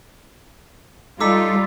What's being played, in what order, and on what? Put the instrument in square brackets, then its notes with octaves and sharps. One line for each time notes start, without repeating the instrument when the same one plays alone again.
[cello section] G3 F4 [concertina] D#4 A4 [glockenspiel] D6 E6 B6